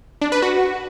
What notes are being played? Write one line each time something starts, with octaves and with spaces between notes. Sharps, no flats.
D4
B4
F#4